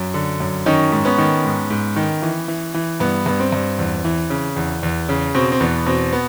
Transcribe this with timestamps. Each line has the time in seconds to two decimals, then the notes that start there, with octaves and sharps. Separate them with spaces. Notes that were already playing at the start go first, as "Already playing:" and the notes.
Already playing: F#2
0.14 D3
0.40 F#2
0.66 D#3 C#4 D#4
0.92 G#2
1.05 B3 C#4
1.18 D#3
1.44 G#2
1.70 G#2
1.96 D#3
2.22 E3
2.48 E3
2.74 E3
3.00 G2 B3
3.26 G2 B3
3.40 C4
3.52 G2
3.79 E2
4.05 E3
4.30 C#3
4.56 E2
4.83 E2
5.09 C#3
5.35 B2 C4
5.52 C4
5.60 E2 B3
5.86 B2 C4
6.13 B3